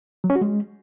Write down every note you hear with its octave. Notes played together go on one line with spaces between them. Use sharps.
F#3
C#4
F#4
G#3